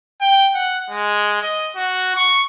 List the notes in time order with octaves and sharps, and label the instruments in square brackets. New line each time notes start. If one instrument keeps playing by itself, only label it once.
[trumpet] G5
F#5
G#3
D#5
F#4
C#6